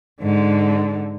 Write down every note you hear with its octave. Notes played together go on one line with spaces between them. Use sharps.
G#2 D3